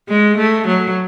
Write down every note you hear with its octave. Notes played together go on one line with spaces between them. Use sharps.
G#3
A3
F#3